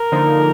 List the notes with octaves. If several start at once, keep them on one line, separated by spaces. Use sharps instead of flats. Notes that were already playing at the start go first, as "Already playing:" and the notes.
Already playing: A#4
D3 F3 A#3 D#4